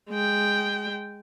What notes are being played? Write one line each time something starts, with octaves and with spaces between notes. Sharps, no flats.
G#3 G5